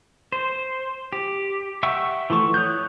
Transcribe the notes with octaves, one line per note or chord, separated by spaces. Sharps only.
C5
G4
E5 F#5 G5 C#6 E6
E3 F3 A3 C#6
C#5 D#6 F#6 G6